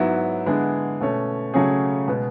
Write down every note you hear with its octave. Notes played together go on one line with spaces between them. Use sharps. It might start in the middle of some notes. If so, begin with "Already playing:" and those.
Already playing: G#2 F#3 B3 E4
D3 G#3 B3 E4 G#4
B2 A3 C#4
C#3 F#3 A3 C#4 G#4
B2 G#3 B3